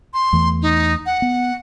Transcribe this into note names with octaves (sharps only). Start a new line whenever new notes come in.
C6
E2 E3 A3
D#4
F#5
B3